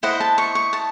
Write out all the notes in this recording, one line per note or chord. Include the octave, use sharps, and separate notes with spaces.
E4 C5 D#5 F#5
A5
C#6
C#6
A5